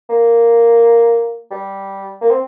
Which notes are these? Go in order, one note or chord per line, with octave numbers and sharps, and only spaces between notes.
A#3
G3
A#3
C4